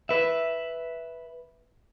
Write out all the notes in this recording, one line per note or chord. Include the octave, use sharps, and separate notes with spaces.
B4 E5